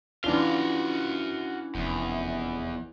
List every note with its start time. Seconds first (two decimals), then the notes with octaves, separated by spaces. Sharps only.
0.24 E3 C#4 D4 F4 F#4 F5 G7
1.75 F1 E2